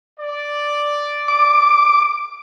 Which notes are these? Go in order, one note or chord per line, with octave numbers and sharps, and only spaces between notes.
D5
D6